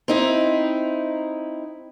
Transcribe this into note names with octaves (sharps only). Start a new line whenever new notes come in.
C4 D#4 E4